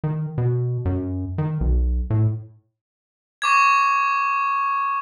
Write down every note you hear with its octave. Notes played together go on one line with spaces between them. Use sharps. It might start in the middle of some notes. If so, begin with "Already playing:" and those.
D#3
B2
F#2
D#3
B1
A2
C#6 D6 G#6